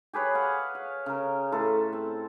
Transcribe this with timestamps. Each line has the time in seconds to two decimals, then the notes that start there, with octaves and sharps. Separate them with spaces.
0.13 G4 G#4 B4 C#5
0.34 G#4 F5 F#5
0.75 F5
1.06 C#3 A#4
1.52 A2 A4 B4 C6
1.93 C4